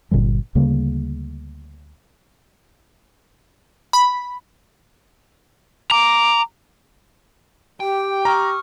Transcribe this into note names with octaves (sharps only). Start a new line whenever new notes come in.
G1 A#2 D3 G3
D2 C#3 G3 A#3
B5
A#5 D6
G4 G5
A#5 C#6 D#6 F6